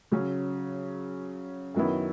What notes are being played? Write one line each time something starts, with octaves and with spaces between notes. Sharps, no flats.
C#3 F#3 C#4
F#2 D#3 F#3 B3 E4